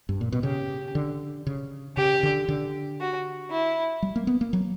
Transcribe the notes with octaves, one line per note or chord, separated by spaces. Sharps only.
G2
A#2
B2
C#3 G4
D3
C#3
C#3 G4
D3
D3
F#4
E4
G3
A#3
B3
A#3
F#3